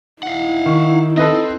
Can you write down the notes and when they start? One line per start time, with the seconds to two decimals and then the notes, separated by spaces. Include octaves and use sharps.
0.23 D#4 E4 F5 F#5
0.66 D#3 C#6
1.17 C4 A4 B4 D#5